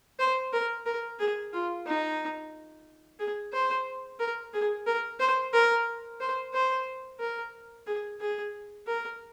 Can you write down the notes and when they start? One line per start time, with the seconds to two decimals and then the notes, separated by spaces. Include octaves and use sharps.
0.19 C5
0.53 A#4
0.86 A#4
1.20 G#4
1.53 F4
1.86 D#4
3.19 G#4
3.53 C5
4.20 A#4
4.54 G#4
4.87 A#4
5.20 C5
5.53 A#4
6.20 C5
6.54 C5
7.20 A#4
7.87 G#4
8.20 G#4
8.87 A#4